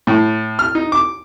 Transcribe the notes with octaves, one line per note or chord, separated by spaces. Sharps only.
A2
F6
D#4
D6